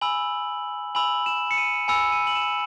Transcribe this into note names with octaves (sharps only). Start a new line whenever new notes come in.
G#5 B5 E6 F#7
G#5 B5 E6 F#7
E7
C#7
D#7
G#5 B5 E6 C#7
D#7
F#7
E7